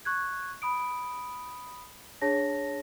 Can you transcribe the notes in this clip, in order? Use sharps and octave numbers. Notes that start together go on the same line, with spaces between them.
C#6 F#6 G#6
B5 D#6 D7
D4 G#4 C#5 A5 A#6